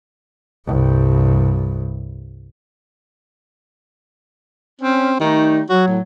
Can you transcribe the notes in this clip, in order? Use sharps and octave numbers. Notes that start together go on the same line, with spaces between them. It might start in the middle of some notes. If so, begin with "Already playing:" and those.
C2 G2
C4 C#4
D#3 G3 A3 D#4
F#3 F#4
A2